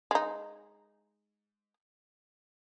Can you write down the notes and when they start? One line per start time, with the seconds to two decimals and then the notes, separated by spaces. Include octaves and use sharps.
0.11 G#3 D#4